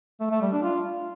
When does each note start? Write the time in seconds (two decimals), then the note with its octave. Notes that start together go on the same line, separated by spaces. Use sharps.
0.20 A3
0.31 A3
0.42 G3
0.52 D4
0.63 F4